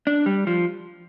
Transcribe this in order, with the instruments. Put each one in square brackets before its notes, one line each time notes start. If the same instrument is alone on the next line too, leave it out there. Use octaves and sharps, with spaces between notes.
[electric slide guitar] D4
G3
F3